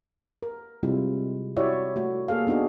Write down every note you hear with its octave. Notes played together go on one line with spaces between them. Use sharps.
A#4
C3 G3 G#3 C4 E4 F4
E4 F#4 G4 C#5 D5 E5
A3 F#4
A#3 G#4 A4 F5
B3 D4 D#4 F#4 G#4